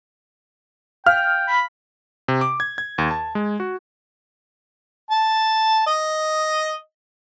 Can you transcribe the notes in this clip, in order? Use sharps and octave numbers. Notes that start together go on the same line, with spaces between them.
F5 G5 F6
B5
C3
D6
G#6
G#6
D#2
A5
G#3
F#4
A5
D#5